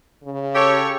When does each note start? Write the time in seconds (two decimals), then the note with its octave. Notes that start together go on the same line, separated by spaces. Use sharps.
0.23 C#3
0.55 G4 A4 C#5